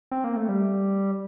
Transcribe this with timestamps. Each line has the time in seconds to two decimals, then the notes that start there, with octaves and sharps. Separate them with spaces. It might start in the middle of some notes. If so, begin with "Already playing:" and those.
0.11 C4
0.24 A#3
0.36 A3
0.49 G3